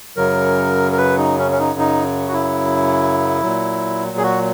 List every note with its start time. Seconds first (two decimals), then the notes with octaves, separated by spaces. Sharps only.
0.16 F#2 C#3 F#3 A#4
0.92 A#4
0.98 B4
1.18 D#4
1.38 C#4
1.52 C#4
1.59 D#4
1.79 D#4
2.28 F#4
2.33 E4
3.42 A#2 F#3
4.17 G#4
4.23 F#4